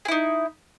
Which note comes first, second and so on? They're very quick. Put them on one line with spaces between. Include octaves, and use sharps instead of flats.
G#4 E4 D#4